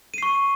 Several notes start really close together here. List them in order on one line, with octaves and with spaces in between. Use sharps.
D#7 C7 C#6